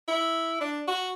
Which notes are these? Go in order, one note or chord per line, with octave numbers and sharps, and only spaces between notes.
E4
D4
F#4